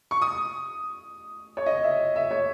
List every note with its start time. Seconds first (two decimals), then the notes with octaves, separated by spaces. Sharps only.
0.11 C#6
0.22 D#6
1.57 C#5
1.66 D#5
1.83 E5
2.16 E5
2.31 C#5